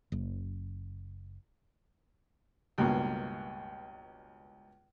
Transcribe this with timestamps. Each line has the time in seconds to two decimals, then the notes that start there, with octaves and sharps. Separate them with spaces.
0.12 F#1
2.78 C#2 G2 B2 A#3